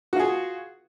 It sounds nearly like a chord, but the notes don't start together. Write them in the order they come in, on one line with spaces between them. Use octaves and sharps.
F#4 F4 G#4